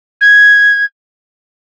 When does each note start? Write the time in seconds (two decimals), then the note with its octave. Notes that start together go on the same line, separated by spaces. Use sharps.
0.21 G#6